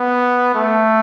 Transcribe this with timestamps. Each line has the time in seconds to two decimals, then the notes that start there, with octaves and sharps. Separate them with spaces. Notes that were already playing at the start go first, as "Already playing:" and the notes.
Already playing: B3
0.54 A3